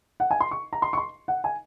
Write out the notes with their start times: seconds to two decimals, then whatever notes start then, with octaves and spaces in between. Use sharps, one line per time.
0.20 F#5
0.31 G#5
0.41 C6
0.51 C#6
0.73 A#5
0.82 C6
0.93 C#6
0.98 C6
1.28 F#5
1.44 G#5